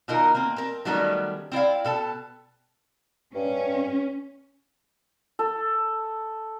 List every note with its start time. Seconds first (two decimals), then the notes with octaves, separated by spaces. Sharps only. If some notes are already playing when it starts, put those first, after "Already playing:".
0.08 B2 D#3 D#4 F4 A#4
0.35 A#3 C4
0.56 C4 A#4
0.85 D#3 F#3 G3 A3 B3 C#4
1.52 C4 E4 D5 F5
1.85 B2 A4 A5
3.35 G2 C#4
5.39 A4